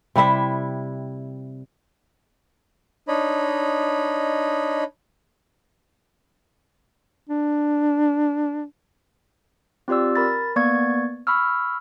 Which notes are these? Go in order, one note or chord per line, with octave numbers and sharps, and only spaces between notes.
C3 G3 E4 E5
D4 D#4 C#5 D#5 B5
D4
C4 F4 G4 D5 E6
A#4 B5 A6
A#3 B3 D5 C#6 G#6
B5 C#6 E6 F6